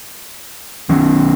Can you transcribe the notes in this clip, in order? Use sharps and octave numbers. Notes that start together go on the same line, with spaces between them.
D#3 F#3 C#4